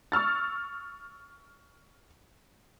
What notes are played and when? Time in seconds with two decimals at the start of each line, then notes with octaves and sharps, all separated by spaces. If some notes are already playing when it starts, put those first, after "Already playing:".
0.12 C#6 E6 F6 A6